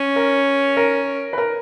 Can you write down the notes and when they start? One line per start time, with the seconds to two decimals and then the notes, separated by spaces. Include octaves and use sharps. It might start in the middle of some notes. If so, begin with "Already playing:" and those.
Already playing: C#4
0.16 A#4
0.77 A#4
1.33 B4
1.38 A#4